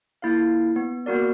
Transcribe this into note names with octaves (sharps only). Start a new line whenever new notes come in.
A#3 E4 F4 F5
B3
A#3 B3 F#4 A#4 D5